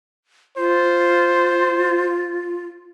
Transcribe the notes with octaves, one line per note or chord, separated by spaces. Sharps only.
F4 C5